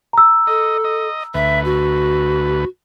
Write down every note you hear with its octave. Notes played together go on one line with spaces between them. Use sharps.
A#5 E6
A4 D#5
D#5
D2 B4 E5
F#4